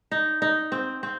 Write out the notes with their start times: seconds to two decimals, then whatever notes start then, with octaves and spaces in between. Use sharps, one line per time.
0.12 D#4
0.42 D#4
0.72 C4
1.03 C4